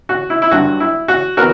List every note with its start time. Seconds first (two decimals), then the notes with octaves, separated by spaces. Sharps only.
0.09 F#4
0.30 E4
0.42 E4
0.51 G2 D3 F#3 F#4
0.80 E4
1.08 F#4
1.37 E3 B3 F#4 A#4